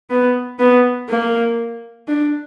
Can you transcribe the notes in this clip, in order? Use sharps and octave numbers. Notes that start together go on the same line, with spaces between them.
B3
B3
A#3
D4